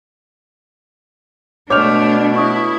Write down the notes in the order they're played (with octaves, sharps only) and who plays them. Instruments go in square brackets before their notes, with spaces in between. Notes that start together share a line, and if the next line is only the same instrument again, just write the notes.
[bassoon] B2 [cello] A3 D4 [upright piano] C#5 F6 [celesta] D6 G6 F7
[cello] E4 [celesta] C#6 D#6